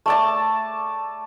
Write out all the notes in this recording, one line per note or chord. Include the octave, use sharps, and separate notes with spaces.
A3 D5 A5